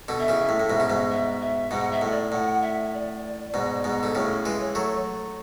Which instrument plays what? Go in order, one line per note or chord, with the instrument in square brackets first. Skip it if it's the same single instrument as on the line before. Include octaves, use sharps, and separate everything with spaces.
[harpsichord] B2 D3
[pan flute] E5
[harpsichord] C#3 E3
A2
A2
G#2 B2
C#3
G#2 B2
[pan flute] E5
E5
[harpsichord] G#2 B2 [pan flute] F#5
[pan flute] E5
[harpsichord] A2 [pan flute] E5
[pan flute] D5
[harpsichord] A2 [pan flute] F#5
[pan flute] E5
D5
[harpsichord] G#2 B2
G#2 B2
D3
[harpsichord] A2 C#3 [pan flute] C#5
[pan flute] A4
[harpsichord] E3 G#3 [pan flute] B4
[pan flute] C#5
[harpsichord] F#3 A3 [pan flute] C#5